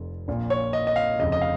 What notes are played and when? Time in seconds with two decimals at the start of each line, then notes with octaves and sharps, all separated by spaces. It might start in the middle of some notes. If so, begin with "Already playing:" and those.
Already playing: F1 F2
0.28 A#1 A#2
0.50 C#5
0.73 D#5
0.87 D#5
0.96 F5
1.19 F1 F2 C#3 D#5
1.32 D#5
1.41 F5